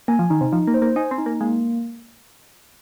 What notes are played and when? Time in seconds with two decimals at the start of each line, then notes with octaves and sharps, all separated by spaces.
0.08 A#3 G#5
0.19 F3
0.30 D#3 D#4
0.41 C3
0.52 F3 D#4
0.68 A#3
0.74 C5
0.82 A#3
0.96 D#4 G#5
1.11 C4
1.18 D#4
1.26 A#3
1.41 G#3 A#3